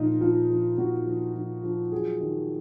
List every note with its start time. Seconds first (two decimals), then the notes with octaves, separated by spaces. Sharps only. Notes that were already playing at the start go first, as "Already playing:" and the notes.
Already playing: A#2 F3 D#4 F4
0.21 F3 F4
0.50 F3
0.78 A#2 F#4
1.06 F3
1.35 F3
1.63 F3
1.92 F#3 G#4
2.20 D#3